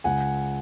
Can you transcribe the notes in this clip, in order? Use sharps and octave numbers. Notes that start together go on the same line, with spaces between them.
C#2 F#5 G#5